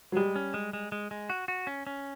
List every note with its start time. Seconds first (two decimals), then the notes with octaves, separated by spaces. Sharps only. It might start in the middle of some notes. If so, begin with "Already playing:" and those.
0.12 F#3
0.16 G3 G#3
0.36 C#4
0.54 G#3
0.73 G#3
0.92 G#3
1.11 G#3
1.30 F#4
1.48 F#4
1.67 C#4
1.87 C#4